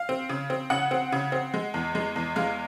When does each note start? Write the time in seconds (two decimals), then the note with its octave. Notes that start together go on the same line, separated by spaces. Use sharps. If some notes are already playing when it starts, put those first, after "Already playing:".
Already playing: F5
0.09 C4
0.29 C#3
0.50 C4
0.70 C#3 F#5
0.91 C4
1.12 C#3
1.32 C4
1.54 G#3
1.74 E2
1.95 G#3
2.16 E2
2.36 G#3 F5